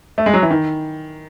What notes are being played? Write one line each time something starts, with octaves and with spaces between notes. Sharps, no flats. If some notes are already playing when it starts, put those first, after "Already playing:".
A3
G#3
F#3
E3
D#3